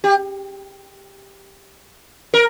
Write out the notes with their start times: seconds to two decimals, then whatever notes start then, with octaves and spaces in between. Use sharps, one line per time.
0.04 G4
2.34 A#4